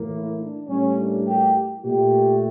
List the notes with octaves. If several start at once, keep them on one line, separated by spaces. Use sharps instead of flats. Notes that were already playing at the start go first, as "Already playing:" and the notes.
Already playing: A2 E3 A#3
E4
D4
A2 G3 A#3 C#4
D4
G4
A#2 A3 G4